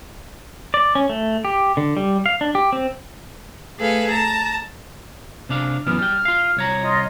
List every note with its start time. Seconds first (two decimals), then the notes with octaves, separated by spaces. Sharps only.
0.74 D5
0.95 C#4
1.09 A3
1.45 G4
1.77 D3
1.97 G3
2.26 F5
2.41 D4
2.55 G4
2.73 C4
3.78 A3 G#4 A4 B4 F5
4.09 A5 A#5
5.49 C3 D4 F5
5.87 F#2 E3 B3 F6
5.99 G3 G5
6.25 F4 F5
6.57 C2 C#5 A#5
6.83 F4 D#5